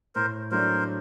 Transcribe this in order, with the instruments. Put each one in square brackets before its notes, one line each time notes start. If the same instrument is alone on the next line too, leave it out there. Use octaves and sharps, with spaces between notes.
[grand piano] A2 [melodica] A#4 C5
[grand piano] F#3 A3 D4 [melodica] A#4 C5